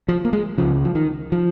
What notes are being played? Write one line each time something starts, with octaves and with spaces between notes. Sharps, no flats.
F3
A#3
G#3
C#2 C#3 F3
F3
D#3
F3